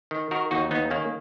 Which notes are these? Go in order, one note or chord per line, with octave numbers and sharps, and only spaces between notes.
D#3
D#3 F#4 A#4
D#2 D#4 F#4
D#2 B3 D#4
D#3 A#3 C#4